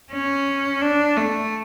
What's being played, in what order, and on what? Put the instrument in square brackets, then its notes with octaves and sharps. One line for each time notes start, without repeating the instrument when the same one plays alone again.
[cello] C#4
D4
A3